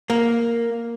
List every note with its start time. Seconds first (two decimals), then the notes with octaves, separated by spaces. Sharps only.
0.10 A#3